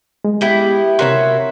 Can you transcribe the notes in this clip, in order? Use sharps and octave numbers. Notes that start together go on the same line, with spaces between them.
G#3
B3 E4 G4
C3 F#4 A#4 C#5 E5 C6